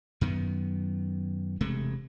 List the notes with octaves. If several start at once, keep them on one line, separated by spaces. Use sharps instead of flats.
F#2 D#3 B3
E1 C3 G#3 A3